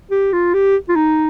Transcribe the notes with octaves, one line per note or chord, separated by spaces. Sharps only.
G4
F4
G4
F4
D#4